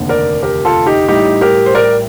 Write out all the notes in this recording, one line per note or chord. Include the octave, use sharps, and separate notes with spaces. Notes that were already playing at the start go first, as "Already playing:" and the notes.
Already playing: F1 D#2 D3
A#4 D5
G4 A#4
F4 A4
D#4 G4
A1 A2 G3 D#4 G4
G4 A#4
C5
A#4 D5